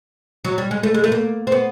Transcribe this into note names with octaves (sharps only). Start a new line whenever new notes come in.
F#3
G3
G#3
A3
G#3
A3
A#3
C4
B3